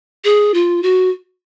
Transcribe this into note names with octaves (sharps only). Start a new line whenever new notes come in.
G#4
F4
F#4